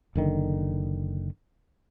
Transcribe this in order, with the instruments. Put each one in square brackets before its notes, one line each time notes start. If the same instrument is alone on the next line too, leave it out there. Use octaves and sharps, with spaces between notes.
[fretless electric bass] F#1 D3 D#3